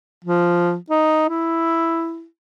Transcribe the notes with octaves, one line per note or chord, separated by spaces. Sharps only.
F3
D#4
E4